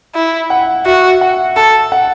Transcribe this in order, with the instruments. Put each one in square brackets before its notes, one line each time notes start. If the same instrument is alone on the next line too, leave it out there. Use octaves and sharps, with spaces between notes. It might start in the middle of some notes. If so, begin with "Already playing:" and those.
[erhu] E4
[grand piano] F#5
[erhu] F#4 [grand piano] E5
[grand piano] F#5
[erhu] A4 [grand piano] A5
[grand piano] F#5